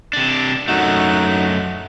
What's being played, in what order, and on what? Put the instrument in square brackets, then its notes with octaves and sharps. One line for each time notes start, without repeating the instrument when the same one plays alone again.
[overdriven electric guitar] C3 D4
[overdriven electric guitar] F#2 A3 [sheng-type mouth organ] D#4 F#4 F#6